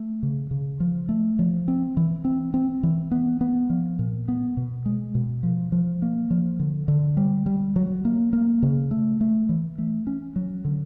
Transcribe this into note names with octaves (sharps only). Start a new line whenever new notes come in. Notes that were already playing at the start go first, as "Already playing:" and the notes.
Already playing: A3
C#3
C#3
F3
A3
F3
C4
E3
C4
C4
E3
B3
B3
F3
A#2
B3
B2
G#3
B2
F3
F3
A#3
F3
D3
D3
G3
G3
F#3
A#3
A#3
C#3
A3
A3
E3
A3
C#4
F#3
D3